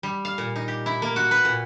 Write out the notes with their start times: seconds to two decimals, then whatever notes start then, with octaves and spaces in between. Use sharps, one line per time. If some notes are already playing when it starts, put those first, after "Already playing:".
0.03 G3
0.25 F5
0.38 A#2
0.56 D#4
0.68 G4
0.86 E4
1.02 A#3
1.16 F#4
1.31 B4
1.45 A#2